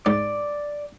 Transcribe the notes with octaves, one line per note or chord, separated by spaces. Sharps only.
G#2 D5